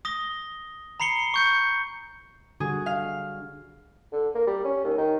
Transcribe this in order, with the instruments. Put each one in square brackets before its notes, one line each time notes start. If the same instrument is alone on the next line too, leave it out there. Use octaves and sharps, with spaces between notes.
[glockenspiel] D#6 A#6 G7
A#5 B5 C7 C#7 G7
C#6 G6 C#7
[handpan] D3 G3 F#4 [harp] G#4
[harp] F5
[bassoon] D3
A#3
G3
C#4
D#2
D#3